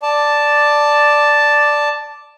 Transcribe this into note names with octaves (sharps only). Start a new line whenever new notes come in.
D5 A5